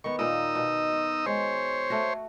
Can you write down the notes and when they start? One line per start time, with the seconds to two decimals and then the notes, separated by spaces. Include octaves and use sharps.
0.04 D#3 B3 C#6
0.19 A#2 A#3 D#4 D#5 E6
0.55 B2
0.91 F#4
1.26 G#3 C5 C#5
1.90 A3 F#4